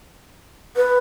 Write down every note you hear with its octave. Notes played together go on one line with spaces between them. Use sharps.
B4